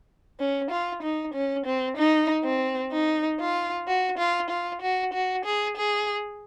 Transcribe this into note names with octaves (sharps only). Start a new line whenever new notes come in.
C#4
F4
D#4
C#4
C4
D#4
C4
D#4
F4
F#4
F4
F4
F#4
F#4
G#4
G#4